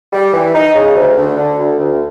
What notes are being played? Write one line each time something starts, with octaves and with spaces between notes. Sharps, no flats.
G3
E3
D#4
C#3
D2
D2
D3
D2
D2